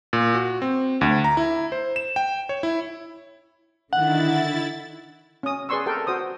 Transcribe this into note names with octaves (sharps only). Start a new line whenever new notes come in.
A#2
F#4
C4
D2
A#5
E4
C5
E7
G5
C#5
E4
D3 D#3 E4 F#5 A6
C#4 D#6
G#4 B4 D5 C6 C#6 E6
G4 A4 A#4 G5
F#4 C5 D#6